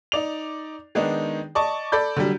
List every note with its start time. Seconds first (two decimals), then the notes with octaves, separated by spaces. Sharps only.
0.12 D#4 D5 F7
0.95 D#3 G#3 B3 D4 D#4
1.55 D5 D#5 A5 C#6
1.92 A4 D5 B5 G6
2.17 D3 F#3 G3